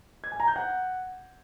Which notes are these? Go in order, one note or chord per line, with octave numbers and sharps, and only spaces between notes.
G#6
G#5
A#5
G6
F#5